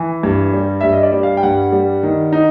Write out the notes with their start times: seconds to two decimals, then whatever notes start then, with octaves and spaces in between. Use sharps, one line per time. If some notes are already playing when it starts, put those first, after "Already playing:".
Already playing: E3
0.23 G2
0.53 G3
0.81 G2 E5
0.92 D#5
1.03 D5
1.12 G3
1.23 F5
1.37 G5
1.43 G2 F#5
1.72 G3
2.03 D#3
2.33 D#4